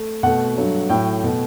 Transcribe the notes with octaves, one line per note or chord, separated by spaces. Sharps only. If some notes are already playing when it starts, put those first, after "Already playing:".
Already playing: A3
B2 A3 F#5
G2 F#3 A3
A2 F#3 A3 G5
B2 A3